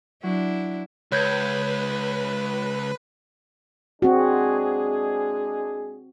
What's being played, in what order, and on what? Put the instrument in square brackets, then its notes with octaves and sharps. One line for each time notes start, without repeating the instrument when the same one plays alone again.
[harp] F#3 [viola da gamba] D4 E4
[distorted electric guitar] C#2 [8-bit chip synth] B4 [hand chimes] C#5 G6 G#6
[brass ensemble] G#3 D4 G#4 [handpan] C4 F#4